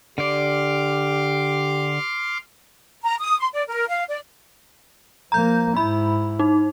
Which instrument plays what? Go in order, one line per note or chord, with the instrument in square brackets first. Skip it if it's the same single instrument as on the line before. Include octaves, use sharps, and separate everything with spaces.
[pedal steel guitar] D3 D5 [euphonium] G4 [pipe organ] C6 D6 F6
[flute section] A#5
D#6
C6
D5
A#4
F5
D5
[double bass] F3 A#3 [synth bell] A#5 G6
[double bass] G#2 E4 [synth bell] B5
[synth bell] D#4